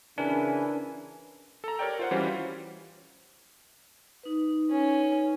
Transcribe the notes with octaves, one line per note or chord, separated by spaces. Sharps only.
C#3 E3 D4 A#4 G#5
A4 A#5
G4 A#4 C#5 D5 G5
F4 C5 F#5
E3 G3 C#4 F4 F#4 C5
D#4 B4
C#4